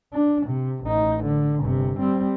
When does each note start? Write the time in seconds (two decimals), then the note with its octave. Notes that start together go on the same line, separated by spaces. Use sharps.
0.14 D4
0.47 C3
0.85 A1 D#4
1.24 D3
1.61 G1 C3
2.00 G3 C4